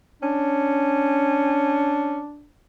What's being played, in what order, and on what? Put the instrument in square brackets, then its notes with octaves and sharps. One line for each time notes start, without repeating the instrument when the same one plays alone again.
[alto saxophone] C#4 [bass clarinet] D4